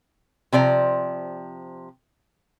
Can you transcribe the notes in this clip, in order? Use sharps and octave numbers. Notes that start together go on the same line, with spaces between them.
C3 F3 D5 A#5